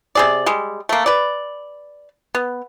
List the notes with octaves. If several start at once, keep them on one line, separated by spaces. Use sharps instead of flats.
C3 G#4 D5
G3 G#3
A3 A#3
B4 D5
B3